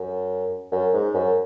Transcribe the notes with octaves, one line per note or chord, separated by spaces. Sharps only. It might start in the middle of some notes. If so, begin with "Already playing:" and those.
Already playing: F#2
F#2
G#2
F#2